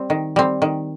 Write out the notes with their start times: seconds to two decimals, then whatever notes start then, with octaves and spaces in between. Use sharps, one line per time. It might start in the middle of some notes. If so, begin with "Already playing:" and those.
Already playing: G3 C4
0.10 D#3
0.36 G3 C4
0.62 D#3